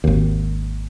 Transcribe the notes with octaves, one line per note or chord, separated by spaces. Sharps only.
G#1 D#2